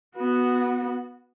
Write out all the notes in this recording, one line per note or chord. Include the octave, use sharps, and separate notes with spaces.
B3 F#4